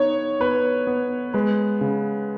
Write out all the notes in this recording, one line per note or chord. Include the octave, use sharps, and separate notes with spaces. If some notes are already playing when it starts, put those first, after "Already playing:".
Already playing: B3 D#4 C#5
B3 B4
B3
G#3 B4
C#3